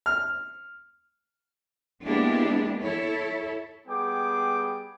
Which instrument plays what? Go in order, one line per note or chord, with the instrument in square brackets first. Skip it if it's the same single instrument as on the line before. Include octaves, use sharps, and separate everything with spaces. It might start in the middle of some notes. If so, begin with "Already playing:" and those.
[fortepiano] F6
[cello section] G#3 A#3 B3 D4 E4 G4
E4 A4 C#5
[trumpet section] G3 B3 G#4 G5 D6